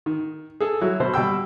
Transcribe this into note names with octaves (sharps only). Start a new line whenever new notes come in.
D#3
G#4 A4
F#3 E4 F#4
B2 C5
B2 G3 G5 E6